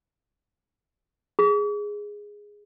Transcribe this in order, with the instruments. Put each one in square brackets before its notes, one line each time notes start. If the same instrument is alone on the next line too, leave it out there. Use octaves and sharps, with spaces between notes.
[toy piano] G#4